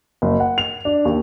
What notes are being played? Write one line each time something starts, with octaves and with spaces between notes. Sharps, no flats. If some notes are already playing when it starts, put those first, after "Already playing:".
F#1
F#5
F7
D4
D#2